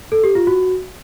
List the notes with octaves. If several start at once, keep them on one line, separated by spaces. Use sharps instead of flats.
A4
G4
F4
F#4